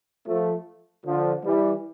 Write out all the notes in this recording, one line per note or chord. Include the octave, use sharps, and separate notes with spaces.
F3 A3
D3 F3
E3 G3